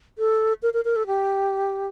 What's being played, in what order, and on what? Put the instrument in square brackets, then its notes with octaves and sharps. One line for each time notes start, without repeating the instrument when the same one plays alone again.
[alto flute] A4
A#4
A#4
A#4
A4
G4